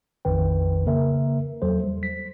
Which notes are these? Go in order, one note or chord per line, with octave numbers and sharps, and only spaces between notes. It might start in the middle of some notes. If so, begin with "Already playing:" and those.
A#1 F2 D#3 B4 G5
C#3 A#3 A#4 E5
E2 F#3 A4 C5
G3
B6